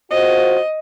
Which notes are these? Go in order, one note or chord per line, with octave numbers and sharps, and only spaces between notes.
F4 F#4 C5 D#5